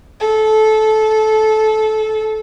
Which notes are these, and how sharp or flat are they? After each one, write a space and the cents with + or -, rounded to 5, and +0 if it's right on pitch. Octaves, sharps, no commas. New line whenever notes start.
A4 -20